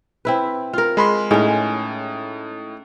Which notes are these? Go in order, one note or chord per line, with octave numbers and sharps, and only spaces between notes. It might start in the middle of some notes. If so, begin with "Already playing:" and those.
C4 E4 B4
F4 A#4
G#3 B5 C6
A2 G#3 C#4 D#4